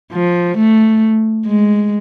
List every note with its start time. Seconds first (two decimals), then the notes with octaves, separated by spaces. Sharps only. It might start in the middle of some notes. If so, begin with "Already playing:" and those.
0.13 F3
0.57 A3
1.46 G#3